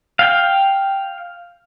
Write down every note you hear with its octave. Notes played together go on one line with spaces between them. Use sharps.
F5 G5